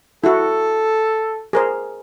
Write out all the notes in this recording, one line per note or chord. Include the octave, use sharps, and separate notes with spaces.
E4 F#4 A4
G#4 A#4 C5